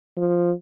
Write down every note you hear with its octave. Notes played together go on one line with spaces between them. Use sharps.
F3